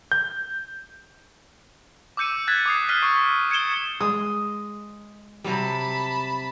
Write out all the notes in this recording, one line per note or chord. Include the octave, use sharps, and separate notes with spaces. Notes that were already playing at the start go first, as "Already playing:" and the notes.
G6
D6 E6 G6 C#7 D#7
F#6 G#6 A6 B6
D6 D#6 C7
F6 F#6 B6 C7 D#7
C#6
G#6 C#7 D7 E7 G7
G#3 D#6
C3 F#3 G3 A5 B5